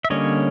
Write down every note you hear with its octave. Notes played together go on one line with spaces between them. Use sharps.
E5
D3 G3 A#3 C#4 C#5 D#5